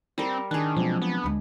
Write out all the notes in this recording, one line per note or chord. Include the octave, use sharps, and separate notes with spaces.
G3 C4 A#4
D#3 D4 G#4 F#6
B2 F3 F#3 G#3 C4
B3
D2 G#3